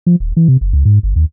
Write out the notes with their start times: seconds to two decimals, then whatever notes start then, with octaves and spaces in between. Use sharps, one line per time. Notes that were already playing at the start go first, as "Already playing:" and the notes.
0.06 F3
0.20 D#1
0.37 E3
0.48 C3
0.61 F#1
0.73 C#2
0.85 G#2
1.03 G1
1.16 D#2